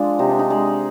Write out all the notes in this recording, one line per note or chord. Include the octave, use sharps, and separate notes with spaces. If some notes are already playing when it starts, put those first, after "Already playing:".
Already playing: F3 G#3 D4
C3 D#4
D4
D#4
G#3